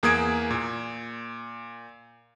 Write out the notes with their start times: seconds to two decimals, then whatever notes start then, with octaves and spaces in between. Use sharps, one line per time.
0.03 E2 A#3 G#4 D#6 G#6 D7
0.50 A#2